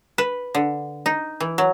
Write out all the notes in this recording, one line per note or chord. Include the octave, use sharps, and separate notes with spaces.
B4
D3
D#4
E3
F#3